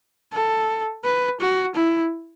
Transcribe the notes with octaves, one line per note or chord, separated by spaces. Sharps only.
A4
B4
F#4
E4